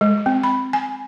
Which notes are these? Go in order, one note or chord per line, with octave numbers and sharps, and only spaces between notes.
G#3
C4
B5
G#5